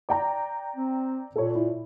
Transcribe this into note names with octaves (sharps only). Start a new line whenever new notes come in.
D5 G5 A#5
C4
A#2 A4 C#5
E4